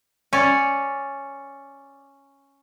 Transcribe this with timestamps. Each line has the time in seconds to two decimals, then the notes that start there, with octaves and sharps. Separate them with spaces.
0.33 C#4 D5